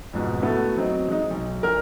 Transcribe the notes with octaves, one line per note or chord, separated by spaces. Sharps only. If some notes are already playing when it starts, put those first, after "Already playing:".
F2 G#2 B2
A3 B3 E4 F#4 A4
F#3 C4 D#4
G#3 D#4
B1
A#1 A#4 F6